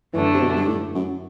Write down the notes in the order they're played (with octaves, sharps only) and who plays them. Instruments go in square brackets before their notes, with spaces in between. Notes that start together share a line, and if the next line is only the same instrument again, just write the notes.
[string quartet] F#2 D3 A3 D4 [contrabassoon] E3
[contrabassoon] C3
B2
G2
A2
F#2